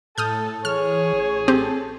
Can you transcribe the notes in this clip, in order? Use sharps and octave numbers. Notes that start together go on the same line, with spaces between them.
A2 A4 D#6 F6 G6
E3 G#4 C#5 F6
A1
C4 G4 A4